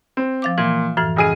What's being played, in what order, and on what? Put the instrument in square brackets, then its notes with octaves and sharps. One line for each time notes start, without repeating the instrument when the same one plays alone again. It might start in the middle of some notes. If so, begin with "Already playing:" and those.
[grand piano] C4
[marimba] F3 F5 D6
[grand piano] A#2 [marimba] E3
[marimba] F#2 A2 E3 [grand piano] F6
[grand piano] C#2 G#4 D#7